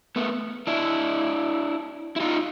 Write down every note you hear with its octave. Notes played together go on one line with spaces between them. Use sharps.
A3 B3
D4 E4
E4
D#4 F4